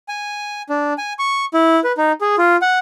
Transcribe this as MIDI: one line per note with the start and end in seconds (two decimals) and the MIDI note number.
0.09 0.62 80
0.69 0.93 62
0.98 1.13 80
1.19 1.45 85
1.54 1.80 64
1.84 1.92 71
1.97 2.12 63
2.21 2.36 68
2.38 2.57 65
2.62 2.79 78